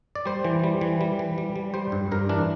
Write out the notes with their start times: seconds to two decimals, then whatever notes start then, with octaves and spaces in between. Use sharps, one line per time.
0.15 D5
0.26 G3 C5
0.44 E3
0.64 G3
0.81 E3
1.01 G3
1.19 E3
1.38 G3
1.56 G3
1.74 G3 C5
1.92 G2
2.11 G2 A#4
2.29 E3 D4